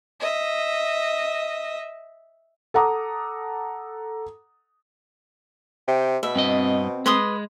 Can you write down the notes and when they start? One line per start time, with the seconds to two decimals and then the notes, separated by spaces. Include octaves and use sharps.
0.20 D#5 E5
2.74 A4 F#5 A#5 D6 D#6
5.88 C3 G5
6.23 B2 E5 B5
6.36 G2 C4 D#5
7.06 G#3 B4 C6 D#6